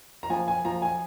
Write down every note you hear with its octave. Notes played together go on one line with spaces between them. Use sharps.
A#5
F3 G#5
G#5
F3 A#5
G#5